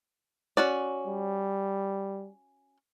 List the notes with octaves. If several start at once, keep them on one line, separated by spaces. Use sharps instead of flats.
C#4 F#4 D5
G3